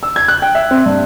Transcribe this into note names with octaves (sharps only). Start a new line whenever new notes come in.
E6
G#6
F#6
G5
E5
C4
G2